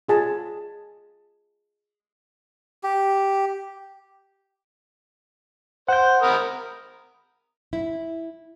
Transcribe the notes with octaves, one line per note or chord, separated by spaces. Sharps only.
F4 G#4 A5
G4
C5 F#5 G6
A#4 B5 D#6
E4